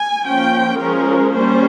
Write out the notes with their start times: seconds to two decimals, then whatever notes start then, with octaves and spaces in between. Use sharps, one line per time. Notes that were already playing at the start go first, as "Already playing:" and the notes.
Already playing: G#5
0.24 F3 A#3 C#4 G5
0.79 F3 G#3 C#4 A#4
1.34 G3 A#3 C#4 C5